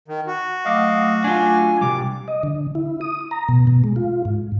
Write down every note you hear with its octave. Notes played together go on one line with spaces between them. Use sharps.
D#3
F#4
F#3 A3 D#5 F5 D6
D4 F4 G#5
C3 G3 D6
D#5
D3
E4
D#6
A#5
B2
B2
G#3
F4
G#2